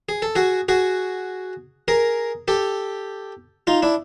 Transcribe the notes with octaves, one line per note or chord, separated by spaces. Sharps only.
G#4
A4
F#4 G#4
F#4 G#4
G#4 A#4
G4 A4
D#4 F4
D4 E4